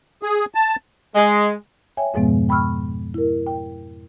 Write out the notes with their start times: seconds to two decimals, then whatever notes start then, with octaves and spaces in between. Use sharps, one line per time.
0.23 G#4
0.55 A5
1.15 G#3
1.97 C#5 E5 G5 G#5
2.14 F2 G#2 B2 F3 G#3 B3
2.49 G5 B5 C#6 E6 F6
3.14 E4 A#4
3.47 G5